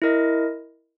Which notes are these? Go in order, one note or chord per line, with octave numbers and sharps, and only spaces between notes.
E4 A#4 D#5